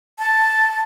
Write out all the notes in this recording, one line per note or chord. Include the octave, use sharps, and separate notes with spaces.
A5